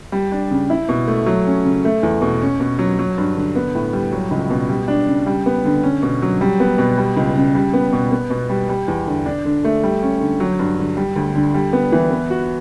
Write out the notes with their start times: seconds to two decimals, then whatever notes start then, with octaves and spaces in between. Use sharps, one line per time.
0.12 G3
0.32 D4
0.51 C#3
0.70 E4
0.89 B2
1.08 A3
1.26 F#3
1.46 C#4
1.65 C#3
1.85 A3
2.03 E2
2.22 B2
2.41 C#4
2.60 B2
2.79 F#3
2.99 F#3
3.18 G2
3.36 D3
3.56 B3
3.75 A2
3.93 G3
4.12 F#3
4.31 C#2
4.50 B2
4.69 G3
4.88 D4
5.07 C#3
5.26 G3
5.46 B3
5.65 D3
5.83 C#4
6.03 B2
6.22 F#3
6.41 G3
6.60 B3
6.78 B2
6.98 G3
7.17 C#2
7.36 C#3
7.55 G3
7.74 B3
7.93 B2
8.12 B3
8.30 B2
8.49 G3
8.69 G3
8.88 E2
9.07 D3
9.26 D4
9.45 D3
9.64 A3
9.83 G3
10.03 C#4
10.20 D3
10.40 F#3
10.59 G2
10.79 D3
10.97 G3
11.16 D2
11.35 D3
11.54 G3
11.73 B3
11.92 E3
12.11 B3
12.30 F#4